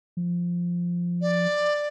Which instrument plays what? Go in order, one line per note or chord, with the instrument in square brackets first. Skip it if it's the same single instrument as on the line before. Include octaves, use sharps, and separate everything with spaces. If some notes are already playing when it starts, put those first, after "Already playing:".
[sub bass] F3
[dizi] D5